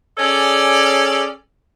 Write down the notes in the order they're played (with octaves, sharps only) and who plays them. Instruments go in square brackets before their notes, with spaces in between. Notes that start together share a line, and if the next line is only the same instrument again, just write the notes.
[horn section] C#4 G#4 A4 C#5 D5